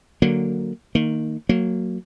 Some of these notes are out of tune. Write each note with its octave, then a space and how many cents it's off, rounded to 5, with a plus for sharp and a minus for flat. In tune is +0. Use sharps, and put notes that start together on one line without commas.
D3 +0 F#3 +0 A#3 -10
D#3 +0 A#3 -20
F#3 +0 A#3 -20